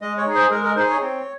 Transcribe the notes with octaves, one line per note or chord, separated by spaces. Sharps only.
G#3 D#5
C#5
D#4 G#4
C5
G#3 A#4
A#4
D#4 G#4 C5
C#5
C4